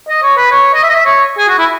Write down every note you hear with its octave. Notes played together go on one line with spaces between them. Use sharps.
D#5
C#5
B4
C#5
D#5
E5
D#5
E5
C#5
G#4
F#4
E4